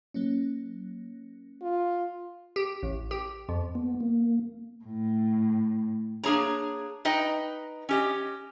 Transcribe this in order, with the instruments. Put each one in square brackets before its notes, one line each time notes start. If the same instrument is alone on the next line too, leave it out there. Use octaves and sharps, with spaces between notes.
[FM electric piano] F#3 A#3 C#4
[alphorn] F4
[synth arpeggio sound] G4
A1
G4
F2
[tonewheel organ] B3
A#3
[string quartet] A2
[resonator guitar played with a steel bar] A#3 D4 G#4 C#5 A#5
D#4 B4 D#5 G5
C#4 G4 D#5